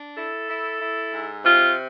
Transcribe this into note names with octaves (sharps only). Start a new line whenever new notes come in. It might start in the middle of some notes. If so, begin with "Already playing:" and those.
Already playing: D4
E4 A4
E4
E4
G#2
C3 F4